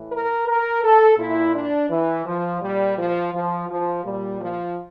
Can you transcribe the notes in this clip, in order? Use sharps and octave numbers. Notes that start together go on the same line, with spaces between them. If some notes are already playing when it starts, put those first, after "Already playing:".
Already playing: A2 E3
A#4
A#4
A4
A#2 E4
D4
E3
F3
A#2 G3
F3
F3
F3
A#2 G3
F3